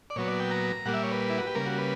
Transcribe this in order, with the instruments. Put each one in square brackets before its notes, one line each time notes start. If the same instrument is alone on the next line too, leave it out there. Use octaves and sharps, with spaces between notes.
[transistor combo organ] D5
A#2 F#3 B3 C#5
D5
G5
A#5
A#2 G3 A#3 F#5
E5
C#5
B4
E4
F#4
G4
C#3 G3 A#3 A#4
F#4
B4